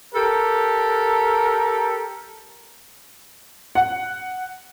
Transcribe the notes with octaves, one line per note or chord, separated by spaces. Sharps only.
G4 A4 A#4
F#5